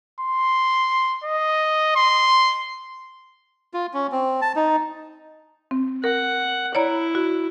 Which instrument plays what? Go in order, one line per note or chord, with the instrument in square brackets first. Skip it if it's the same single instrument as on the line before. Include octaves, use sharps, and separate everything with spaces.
[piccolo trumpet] C6
D#5
C6
[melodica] F4
C#4
C4
A5
D#4
[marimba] C4
[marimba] A#4 [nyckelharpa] F#5
[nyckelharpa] E4 [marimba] C#5 D5 A#5
[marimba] F#4